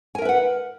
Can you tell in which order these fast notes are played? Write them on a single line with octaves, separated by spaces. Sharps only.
G#5 A#4 E5 B4 F#5